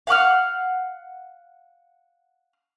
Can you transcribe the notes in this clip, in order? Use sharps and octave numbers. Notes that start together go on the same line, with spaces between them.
F5 F#5 D6 F6